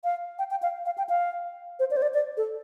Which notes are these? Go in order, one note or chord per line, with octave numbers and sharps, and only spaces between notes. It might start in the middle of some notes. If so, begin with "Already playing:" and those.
F5
G5
G5
F5
F5
G5
F5
C5
D5
C5
D5
D5
A4